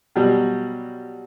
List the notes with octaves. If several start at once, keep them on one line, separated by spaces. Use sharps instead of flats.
B2 F#3 G3